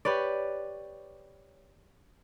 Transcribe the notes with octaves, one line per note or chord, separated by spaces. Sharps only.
G4 B4 C#5 D5